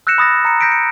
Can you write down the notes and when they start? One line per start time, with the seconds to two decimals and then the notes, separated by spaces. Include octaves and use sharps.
0.07 E6 F#6 G6 A#6 C#7 E7
0.18 B5 D#6 A6 A#6
0.45 A#5 C#7
0.61 G6 A#6 B6 C#7 D7
0.72 C#7